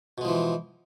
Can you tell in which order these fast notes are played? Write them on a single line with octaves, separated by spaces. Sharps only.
B2 G#3 F3 E3